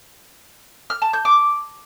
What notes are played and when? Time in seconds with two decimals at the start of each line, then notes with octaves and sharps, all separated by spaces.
0.90 F6
1.02 A5
1.13 G6
1.25 D6